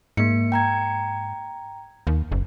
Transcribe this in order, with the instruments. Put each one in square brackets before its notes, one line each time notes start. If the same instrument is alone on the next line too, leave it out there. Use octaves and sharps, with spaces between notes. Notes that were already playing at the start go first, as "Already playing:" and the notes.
[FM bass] G#2 [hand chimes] A#3 C#7
[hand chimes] G5 A#5 G#6
[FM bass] D#2
F#1